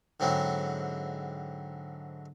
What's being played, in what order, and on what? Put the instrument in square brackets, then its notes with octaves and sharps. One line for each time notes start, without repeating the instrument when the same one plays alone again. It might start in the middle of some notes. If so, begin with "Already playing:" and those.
[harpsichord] G#2 D3 F#3 C4 E4